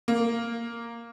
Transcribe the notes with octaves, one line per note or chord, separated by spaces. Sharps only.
A#3